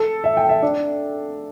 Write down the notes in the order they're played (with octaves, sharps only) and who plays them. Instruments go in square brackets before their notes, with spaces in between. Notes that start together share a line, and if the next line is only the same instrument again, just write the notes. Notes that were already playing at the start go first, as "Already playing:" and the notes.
Already playing: [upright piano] A4
E5
G5
E5
D4